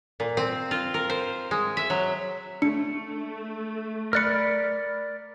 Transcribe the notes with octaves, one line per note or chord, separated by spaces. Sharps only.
A#2
C4
F4
A#4
C5
G#3
E5
F#3
A3 D4 C#7
A#4 D5 B5 F6 F#6 C#7